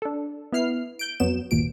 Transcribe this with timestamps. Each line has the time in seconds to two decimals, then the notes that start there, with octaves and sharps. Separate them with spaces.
0.02 D4 A4
0.53 B3 E4 F6 C7
0.99 G6 D7
1.20 F2 F#3 B3 E7
1.51 G1 D#2 A#2 D7